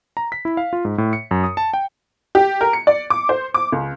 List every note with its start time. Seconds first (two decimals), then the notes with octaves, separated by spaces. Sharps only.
0.17 A#5
0.32 B6
0.45 E4
0.57 F5
0.73 F4
0.85 G#2
0.98 A2
1.13 C#7
1.31 F#2
1.44 D#6
1.57 A5
1.74 G5
2.35 G4
2.61 A#4
2.73 C#7
2.87 D5
3.10 D6
3.29 C5
3.54 D6
3.72 C#2